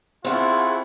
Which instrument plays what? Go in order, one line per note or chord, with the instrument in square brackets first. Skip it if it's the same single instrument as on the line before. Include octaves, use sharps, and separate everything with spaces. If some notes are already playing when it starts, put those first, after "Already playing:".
[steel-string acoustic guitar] C4 E4 [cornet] F4 [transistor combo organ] G#4 F#5 C#6